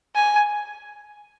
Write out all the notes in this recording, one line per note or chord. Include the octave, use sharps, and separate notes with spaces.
G#5